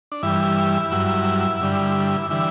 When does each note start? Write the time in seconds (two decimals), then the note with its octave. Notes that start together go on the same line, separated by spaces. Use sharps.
0.12 D4
0.23 G2 E3 G3 E4
0.91 G2 F#3
1.61 G2 D3 G3
2.30 D3 E3 G3 E4